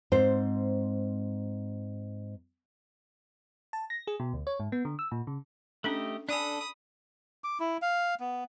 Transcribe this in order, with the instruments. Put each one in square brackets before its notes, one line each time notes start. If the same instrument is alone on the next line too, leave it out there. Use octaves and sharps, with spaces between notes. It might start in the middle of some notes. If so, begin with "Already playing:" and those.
[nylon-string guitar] G#2 C4 C5
[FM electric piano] A5
A#6
G#4
B2
D2
C#5
G#2
B3
D3
E6
A#2
C#3
[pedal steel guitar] A3 G4 D#5 [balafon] C#4 D4 A4
[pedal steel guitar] D4 A4 [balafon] D5 G#5 [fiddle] B5 D#6
[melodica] D6
E4
F5
B3